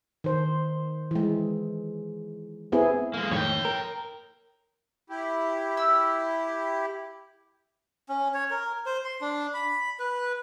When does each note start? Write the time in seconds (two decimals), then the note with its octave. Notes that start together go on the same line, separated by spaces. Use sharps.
0.24 D#3 C5
1.11 E3 G#3
2.72 B3 C4 E4 G#4
3.14 G#3 A#3
3.31 F2 A2 D#3 C#5 G5
3.65 A#4
5.10 E4 G4
5.77 E6
8.09 C#4
8.34 C#5
8.50 A#4
8.86 C5
9.05 C6
9.21 D4
9.54 B5
9.99 B4